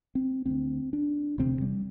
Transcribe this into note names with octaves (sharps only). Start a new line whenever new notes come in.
C4
D2 D3 C4
D4
E1 D2 C3 C4
G3